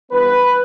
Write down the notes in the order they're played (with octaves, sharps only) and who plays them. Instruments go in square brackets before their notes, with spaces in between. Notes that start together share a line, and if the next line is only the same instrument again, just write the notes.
[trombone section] G2 E3 B3 B4